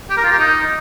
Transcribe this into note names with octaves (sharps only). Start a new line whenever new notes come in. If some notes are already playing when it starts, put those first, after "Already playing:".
G4
A#4
F4
G4
D#4